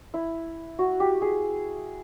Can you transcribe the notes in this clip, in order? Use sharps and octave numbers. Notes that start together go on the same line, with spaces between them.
E4
F#4
G4
G#4